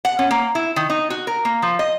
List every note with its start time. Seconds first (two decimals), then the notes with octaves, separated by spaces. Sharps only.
0.05 F#5
0.19 C#4
0.31 A#3
0.55 E4
0.76 D#3
0.90 D#4
1.10 F#4
1.27 A#4
1.45 A#3
1.62 F3
1.79 D#5